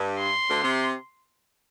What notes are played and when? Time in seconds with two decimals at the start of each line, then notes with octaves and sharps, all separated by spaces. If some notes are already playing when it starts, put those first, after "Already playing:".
Already playing: G2
0.19 C6
0.47 D2 D3
0.61 C3